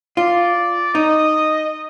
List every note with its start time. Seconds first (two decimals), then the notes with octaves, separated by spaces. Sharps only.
0.17 F4 D5
0.95 D#4 D#5